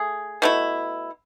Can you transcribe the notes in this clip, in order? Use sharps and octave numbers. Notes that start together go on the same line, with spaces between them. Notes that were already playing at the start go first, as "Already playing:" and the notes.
Already playing: A3 G#4
B2 A3 E4